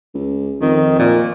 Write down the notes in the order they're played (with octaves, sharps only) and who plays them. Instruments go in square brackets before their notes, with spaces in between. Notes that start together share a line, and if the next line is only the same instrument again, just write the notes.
[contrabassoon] C#2
[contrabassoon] F2 [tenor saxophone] D#3
[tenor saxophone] A#2